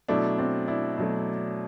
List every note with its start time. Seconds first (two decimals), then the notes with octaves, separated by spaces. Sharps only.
0.08 B2 F#3 A3 D4 E4
0.38 C4 D4
0.68 D4 E4
0.98 B2 F#3 A3